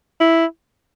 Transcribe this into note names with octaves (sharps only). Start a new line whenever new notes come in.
E4